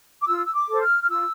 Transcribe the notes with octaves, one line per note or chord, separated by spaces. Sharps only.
D6
F4 E6
E6
D6
A4 C5
F6
F6
F4 E6